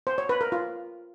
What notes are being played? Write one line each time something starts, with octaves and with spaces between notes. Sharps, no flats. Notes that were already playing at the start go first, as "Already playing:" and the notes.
C5
C#5
B4
A#4
F4